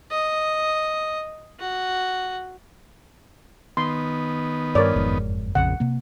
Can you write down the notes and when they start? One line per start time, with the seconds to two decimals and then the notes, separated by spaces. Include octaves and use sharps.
0.11 D#5
1.59 F#4
3.77 D#3 B3 C6
4.75 G2 A#4 C#5 D5
4.96 F#1 F2 G#2
5.55 A#1 F2 C#3 F#5
5.80 C3 A#3